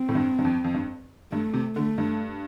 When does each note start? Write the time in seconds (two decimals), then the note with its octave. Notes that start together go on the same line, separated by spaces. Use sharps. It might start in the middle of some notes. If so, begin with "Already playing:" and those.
Already playing: C4
0.09 A2
0.15 G2
0.39 G2
0.45 F2
0.64 F2
0.74 G2
1.32 G2 A3
1.54 C3
1.76 D3 A3
1.98 G2